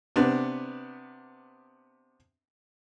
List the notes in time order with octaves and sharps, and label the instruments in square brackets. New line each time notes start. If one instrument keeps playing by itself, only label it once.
[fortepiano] C3 B3 D4